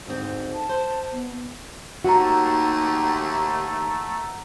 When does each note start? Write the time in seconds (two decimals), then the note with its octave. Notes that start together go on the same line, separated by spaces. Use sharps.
0.06 D2 G#2 C4
0.54 A5
0.69 C5
1.12 B3
2.04 D#2 A3 F#4 F#5 A#5